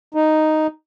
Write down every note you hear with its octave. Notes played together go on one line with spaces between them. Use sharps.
D#4